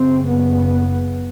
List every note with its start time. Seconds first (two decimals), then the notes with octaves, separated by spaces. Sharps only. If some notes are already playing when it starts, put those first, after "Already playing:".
Already playing: F#1 F#2 C#3 C4
0.26 B3